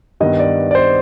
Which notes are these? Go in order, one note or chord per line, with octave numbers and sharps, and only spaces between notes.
G2 D#3 B3 D#5
D5
D5
C5